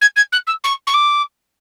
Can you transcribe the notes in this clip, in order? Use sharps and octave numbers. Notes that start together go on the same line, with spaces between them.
G#6
G#6
F#6
E6
C#6
C#6
D6